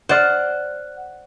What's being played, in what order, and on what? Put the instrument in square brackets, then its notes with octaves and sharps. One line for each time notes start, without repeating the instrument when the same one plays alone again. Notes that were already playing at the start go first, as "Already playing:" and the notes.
[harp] C5 D5 F6 [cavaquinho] F#5